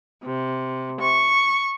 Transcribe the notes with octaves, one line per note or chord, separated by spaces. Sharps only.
C3
C#6